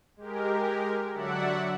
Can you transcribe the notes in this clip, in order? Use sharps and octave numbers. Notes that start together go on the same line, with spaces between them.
G#3 G4 A#4
D3 F#3 D5 E5 F#5